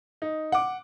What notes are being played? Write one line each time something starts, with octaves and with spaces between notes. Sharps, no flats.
D#4
F#5 D6